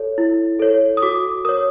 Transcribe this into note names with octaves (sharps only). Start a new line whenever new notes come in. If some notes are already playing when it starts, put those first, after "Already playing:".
Already playing: A4 C#5
E4
A4 C#5
D#6
F#4 D6
A#4 C#5 D#6